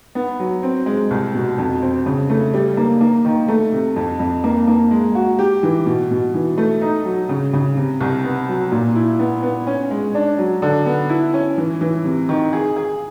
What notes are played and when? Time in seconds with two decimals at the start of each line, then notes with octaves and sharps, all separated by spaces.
0.15 B3
0.40 F#3
0.63 C4
0.86 G#3
1.11 C2
1.34 B2
1.58 F2
1.82 C4
2.06 C#3
2.30 A3
2.54 G3
2.77 A#3
3.01 A#3
3.25 D#3
3.48 A3
3.72 C3
3.96 F2
4.19 F2
4.44 A#3
4.68 A#3
4.91 G#3
5.15 F#4
5.39 G4
5.63 E3
5.86 B2
6.11 B2
6.34 E3
6.58 A3
6.81 D#4
7.05 F#3
7.29 C#3
7.53 C#3
7.77 C3
8.01 C2
8.25 B3
8.49 F#3
8.72 A#2
8.95 E4
9.19 B3
9.43 B3
9.67 C#4
9.91 G#3
10.15 D4
10.38 F#3
10.62 D3
10.86 B3
11.09 E4
11.34 C#4
11.58 E3
11.81 E3
12.05 C3
12.29 D#3
12.53 G#4
12.77 G#4